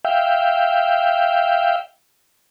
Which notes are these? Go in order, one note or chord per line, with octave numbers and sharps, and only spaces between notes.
E5 F5 G5